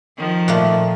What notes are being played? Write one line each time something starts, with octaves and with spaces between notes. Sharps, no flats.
D#3 F3
A#2 A3 A#3